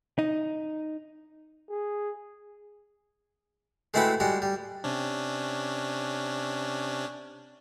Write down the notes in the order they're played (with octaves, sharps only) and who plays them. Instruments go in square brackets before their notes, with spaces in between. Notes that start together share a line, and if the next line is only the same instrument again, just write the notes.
[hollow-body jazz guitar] D#4
[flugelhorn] G#4
[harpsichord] G#3 A3 C4 E4 F#4 B4
G3 G#3 F#4
G3
[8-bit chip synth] C3 C#4 D4